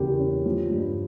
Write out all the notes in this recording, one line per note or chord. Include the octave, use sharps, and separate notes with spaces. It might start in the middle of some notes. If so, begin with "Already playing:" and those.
Already playing: E2 C#3 G3 G4 A#4
C#4
F3
G2